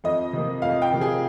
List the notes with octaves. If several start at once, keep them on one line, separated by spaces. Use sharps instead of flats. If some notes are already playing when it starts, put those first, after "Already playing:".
F2 D#5
C3 F3 A#3
F2 F5
G5
C3 F3 A#3
G#4